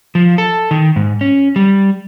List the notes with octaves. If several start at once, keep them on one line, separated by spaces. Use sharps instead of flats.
F3
A4
D#3
G#2
C#4
G3